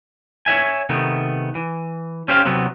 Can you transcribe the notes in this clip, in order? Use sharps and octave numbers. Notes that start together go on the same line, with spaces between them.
C#5 D#5 E5 G#5
C3 D#3 A3 B3
E3
C#4 G4 C5 F5
C3 F#3 B3 C4